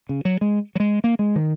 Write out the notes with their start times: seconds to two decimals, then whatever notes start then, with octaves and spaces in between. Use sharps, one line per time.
0.09 C#3
0.25 F#3
0.41 G#3
0.75 F#3
0.80 G#3
1.04 A#3
1.19 G#3
1.36 D#3